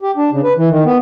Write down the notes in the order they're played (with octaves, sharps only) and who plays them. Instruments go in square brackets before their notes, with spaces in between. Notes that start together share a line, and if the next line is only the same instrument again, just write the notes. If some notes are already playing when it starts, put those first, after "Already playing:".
[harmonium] G4
D4
C#3
B4
E3
D#3
B3